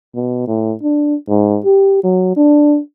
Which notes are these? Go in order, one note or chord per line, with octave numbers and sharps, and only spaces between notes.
B2
A2
D4
G#2
G4
F#3
D4